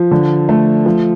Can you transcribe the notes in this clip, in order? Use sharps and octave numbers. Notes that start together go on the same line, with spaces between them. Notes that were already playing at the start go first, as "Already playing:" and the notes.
Already playing: F3
D3
A3
F3